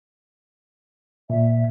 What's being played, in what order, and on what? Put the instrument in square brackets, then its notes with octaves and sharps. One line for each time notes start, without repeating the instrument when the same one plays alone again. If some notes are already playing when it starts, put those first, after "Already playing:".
[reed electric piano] A#2 [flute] E5